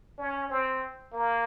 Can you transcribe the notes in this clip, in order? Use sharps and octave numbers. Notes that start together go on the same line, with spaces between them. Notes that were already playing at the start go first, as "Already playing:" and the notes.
C#4
C4
A#3